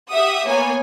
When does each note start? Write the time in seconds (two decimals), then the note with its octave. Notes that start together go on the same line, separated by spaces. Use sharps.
0.10 G4 E5 F#5 D#6
0.47 A#3 B3 C#5 G#5